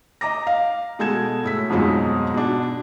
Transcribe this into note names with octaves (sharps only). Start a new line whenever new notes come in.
D#5 A#5 D6 A#6
F5
B2 G#3 A4 G#6 E7
A2 E6 B6
F2 G#2 B2 F#3 G#3 D#4
B2 D4